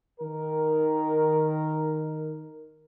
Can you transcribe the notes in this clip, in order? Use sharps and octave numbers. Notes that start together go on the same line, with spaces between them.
D#3 A#4